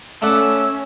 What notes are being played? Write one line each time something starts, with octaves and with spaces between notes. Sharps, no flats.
A3 C#4 D5 E5 F#5